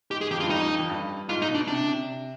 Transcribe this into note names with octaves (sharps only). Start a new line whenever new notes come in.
G#2 G4
G#4
F2 G4
G2 F4
F2 D#4
F2
G2
G#2 F4
D#4
B2
D4
C3 D4
C3